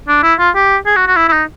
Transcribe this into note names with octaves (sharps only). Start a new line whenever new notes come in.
D4
E4
F4
G4
G#4
F#4
F#4
E4
E4
D#4